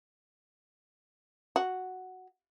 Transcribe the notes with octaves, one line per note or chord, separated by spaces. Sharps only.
F#4